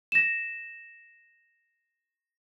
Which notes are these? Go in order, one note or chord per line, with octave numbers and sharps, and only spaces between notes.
A#6 E7